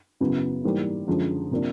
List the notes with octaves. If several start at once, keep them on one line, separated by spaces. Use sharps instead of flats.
F#2 C#3 F#3 B3 E4
G#2 E3 G3 A#3
F#2 D3 F3 G#3
C3 F3 A#3 D4